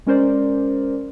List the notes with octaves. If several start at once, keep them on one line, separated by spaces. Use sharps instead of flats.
G#3 C#4 A#4 C5 D5